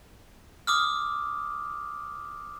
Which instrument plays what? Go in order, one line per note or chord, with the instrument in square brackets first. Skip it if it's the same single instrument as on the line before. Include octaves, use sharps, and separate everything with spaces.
[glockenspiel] D6 D#6 F6